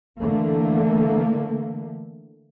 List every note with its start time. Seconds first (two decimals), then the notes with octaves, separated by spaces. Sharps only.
0.19 D3 E3 A3 A#3